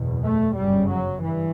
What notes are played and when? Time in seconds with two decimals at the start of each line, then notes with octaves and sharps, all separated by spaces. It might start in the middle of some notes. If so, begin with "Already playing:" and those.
Already playing: F#1 E2 B2
0.24 A3
0.57 G1 F#2 C#3 G3
0.90 F#3
1.22 G2 E3